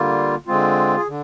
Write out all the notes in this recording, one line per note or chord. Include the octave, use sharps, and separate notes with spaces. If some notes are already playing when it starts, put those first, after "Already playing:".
Already playing: D3 G3 A#3 F4
D3 G#3 C4 F4
G#4
D3